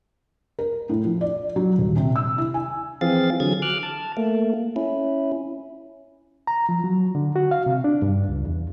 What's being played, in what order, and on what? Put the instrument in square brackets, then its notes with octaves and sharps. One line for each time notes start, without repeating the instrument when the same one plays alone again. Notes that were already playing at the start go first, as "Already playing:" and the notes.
[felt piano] A#4
A2
F3
D5
F#3
D#1
C3
E6
E4
G#5
[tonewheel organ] E3 F3 C4 G#4 F5 A6
D3 F#3 G#4 G#6
D6 F6 F#6
A5
A3 A#3
C#4 E4
[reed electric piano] A#5
F3
F#3
D3
F#4
F5
C3
D4
G2
C#2
E2